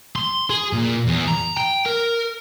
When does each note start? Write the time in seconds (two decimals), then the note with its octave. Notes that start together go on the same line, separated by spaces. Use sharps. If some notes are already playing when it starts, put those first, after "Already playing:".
0.16 C6
0.50 G#4
0.73 A#2
1.07 E2
1.28 A#5
1.57 G5
1.86 A#4